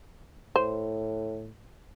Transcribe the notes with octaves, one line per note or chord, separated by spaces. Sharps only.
A2 C5